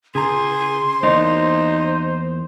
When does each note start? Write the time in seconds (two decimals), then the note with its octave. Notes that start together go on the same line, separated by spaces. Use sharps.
0.15 C#3 G#4 A#5 C6
1.03 E2 A#3 D#4 C5 D5